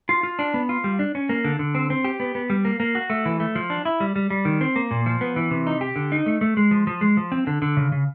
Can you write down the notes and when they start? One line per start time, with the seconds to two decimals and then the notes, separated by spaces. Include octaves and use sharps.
0.09 F4
0.23 F4
0.39 D4
0.54 B3
0.69 F4
0.84 G3
0.99 D4
1.15 C#4
1.29 A#3
1.44 D3
1.59 D3
1.75 C4
1.90 C4
2.04 G4
2.20 B3
2.35 B3
2.50 G3
2.65 A#3
2.80 A#3
2.95 F#4
3.10 A3
3.25 E3
3.40 A3
3.55 F3
3.70 D4
3.85 E4
4.00 G3
4.16 G3
4.30 G3
4.45 D#3
4.61 C4
4.76 A#3
4.91 A#2
5.06 F3
5.21 B3
5.36 E3
5.51 C3
5.67 D#4
5.81 G4
5.96 D3
6.12 D#4
6.26 A3
6.41 A3
6.57 G#3
6.71 F3
6.87 F3
7.01 G#3
7.17 F3
7.32 C4
7.47 D3
7.62 D3
7.77 C#3
7.92 C#3